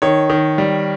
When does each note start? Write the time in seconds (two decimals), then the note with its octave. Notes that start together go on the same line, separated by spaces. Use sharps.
0.02 D#3 C#5
0.30 D#3
0.58 G3